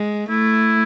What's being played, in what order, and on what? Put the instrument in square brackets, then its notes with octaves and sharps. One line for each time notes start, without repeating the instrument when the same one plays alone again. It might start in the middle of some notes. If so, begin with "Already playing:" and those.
Already playing: [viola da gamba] G#3
[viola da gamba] A3 [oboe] E4